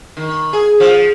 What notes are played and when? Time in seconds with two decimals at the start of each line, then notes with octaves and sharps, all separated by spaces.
0.17 D#3
0.53 G#4
0.80 F3